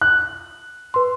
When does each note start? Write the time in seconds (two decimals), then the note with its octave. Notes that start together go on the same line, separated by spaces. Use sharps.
0.01 F#6
0.94 B4 C6